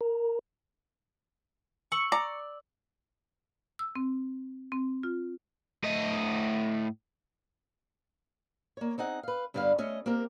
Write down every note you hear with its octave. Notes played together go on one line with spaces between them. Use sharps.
A#4
C#6 E6 F#7
D5 A#5
E6
C4
C4
F4
A2 D#5
A#3 C#5
C4 D#4 G#4 F#5
B4 F5
G2 D3 G3 B3 F5
A3 C#4 D#5
A#3 C4 G4 A#4